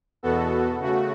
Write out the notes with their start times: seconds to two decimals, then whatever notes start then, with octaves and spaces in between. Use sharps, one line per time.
0.23 E2 B2 B3 F#4 A4
0.79 C#3 A3 F#4